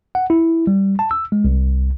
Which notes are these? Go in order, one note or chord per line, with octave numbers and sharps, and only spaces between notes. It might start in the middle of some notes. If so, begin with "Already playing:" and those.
F#5
E4
G3
A5
E6
G#3
C2